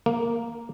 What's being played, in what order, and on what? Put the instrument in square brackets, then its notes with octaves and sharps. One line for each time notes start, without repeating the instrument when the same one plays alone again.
[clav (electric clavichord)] A#3